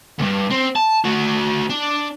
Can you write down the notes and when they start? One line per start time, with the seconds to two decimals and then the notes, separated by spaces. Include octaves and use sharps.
0.18 D2 G2
0.50 C4
0.76 A5
1.04 A3 F#4
1.69 D4